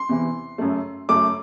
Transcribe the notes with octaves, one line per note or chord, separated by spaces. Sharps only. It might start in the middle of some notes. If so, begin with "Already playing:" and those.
Already playing: C6
E2 C3 E3
F#2 C#3 F#3 A3
F#2 C#3 F#3 A3 D6